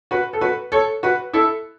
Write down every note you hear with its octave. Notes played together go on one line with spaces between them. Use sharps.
F#4 B4
A4
F#4 B4
A4 C#5
F#4 B4
E4 A4